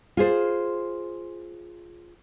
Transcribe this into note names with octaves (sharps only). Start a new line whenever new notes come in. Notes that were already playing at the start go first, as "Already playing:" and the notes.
F4 G#4 C5